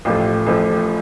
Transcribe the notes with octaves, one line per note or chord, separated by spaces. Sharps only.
A1 A2 F3 A3 F4 G4
A1 A2 F3 A3